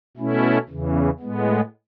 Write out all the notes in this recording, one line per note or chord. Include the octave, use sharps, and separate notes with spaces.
B2 A3 C#4 E4
E2 C#3 E3
A2 G#3 B3